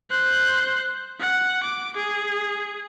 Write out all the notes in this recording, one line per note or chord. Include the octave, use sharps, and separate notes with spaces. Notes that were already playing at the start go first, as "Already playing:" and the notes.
C5 F#6
F#5
D6
G#4